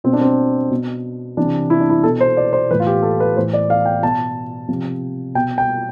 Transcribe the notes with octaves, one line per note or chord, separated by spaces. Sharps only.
B2 C4
D4
C4
B2
C3 E3 D4
E4
D4
E4
B2 A4
C5
D5
C5
A2 E3 B4
F4
G4
A4
B4
A2 E3 C5
D5
F5
G5
B2 A5
C3 F3
B2 G5
G5